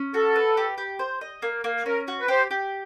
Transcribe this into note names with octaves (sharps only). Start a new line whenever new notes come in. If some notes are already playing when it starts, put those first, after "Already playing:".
Already playing: C#4
F#4 A4
B4
G4
G4
C5
D#5
A#3
A#3
C#4 A#4
F#4
B4
G4 C5
G4